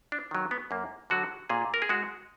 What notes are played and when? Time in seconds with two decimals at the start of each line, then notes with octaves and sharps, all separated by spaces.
0.12 D4
0.31 D#3 F#3
0.51 B3
0.71 F#2 A#3
1.10 D3 F#3 F#4
1.49 A#2 G#4
1.74 A#4
1.82 G#4
1.89 G#3 F#4